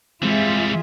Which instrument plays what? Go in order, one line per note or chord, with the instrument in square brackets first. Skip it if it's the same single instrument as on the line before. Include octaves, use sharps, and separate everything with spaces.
[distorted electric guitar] E3 G3 [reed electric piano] G#3 C4 [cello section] F4 G#4 E5